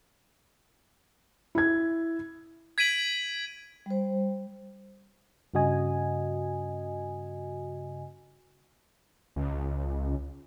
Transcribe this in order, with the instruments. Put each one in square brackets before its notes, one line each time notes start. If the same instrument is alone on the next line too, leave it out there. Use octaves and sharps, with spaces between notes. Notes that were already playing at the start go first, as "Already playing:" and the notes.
[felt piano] E4 G#6
[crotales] G#6 B6 D7 D#7 F#7
[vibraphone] G3 C5
[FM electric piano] G2 C#3 F#4 D#5 G#5
[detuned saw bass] C#2